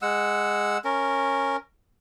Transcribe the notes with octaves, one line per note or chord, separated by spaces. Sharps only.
G#3 F#5 E6
C#4 A#4